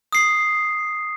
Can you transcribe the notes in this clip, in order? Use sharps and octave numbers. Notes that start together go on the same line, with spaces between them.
D#6 C7